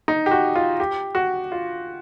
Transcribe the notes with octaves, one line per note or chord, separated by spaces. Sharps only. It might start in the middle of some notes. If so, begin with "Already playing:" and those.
D#4
G4
F#4
F4
G4
F#4
F4